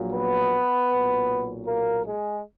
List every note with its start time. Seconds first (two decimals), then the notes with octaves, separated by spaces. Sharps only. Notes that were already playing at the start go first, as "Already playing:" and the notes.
Already playing: A#1 A#2 F#3 A#3
0.12 B3 B4
0.90 B1 A#2 F#3
1.67 A#3 A#4
2.06 G#3 G#4